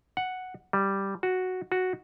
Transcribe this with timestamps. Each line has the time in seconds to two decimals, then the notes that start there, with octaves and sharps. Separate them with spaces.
0.17 F#5
0.73 G3
1.23 F#4
1.72 F#4